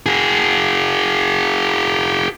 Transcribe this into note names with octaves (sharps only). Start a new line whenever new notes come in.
F#4 G#4